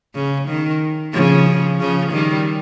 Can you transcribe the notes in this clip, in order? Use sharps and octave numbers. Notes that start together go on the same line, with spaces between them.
C#3
D#3
C#3 F3
C#3 F3
D#3 G3